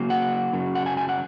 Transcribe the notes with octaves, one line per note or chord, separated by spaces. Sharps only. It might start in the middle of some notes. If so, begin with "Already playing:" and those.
Already playing: C#3 F#3 A#3
F#5
F#2 C#3 F#3
F#5
G#5
G#5
F#5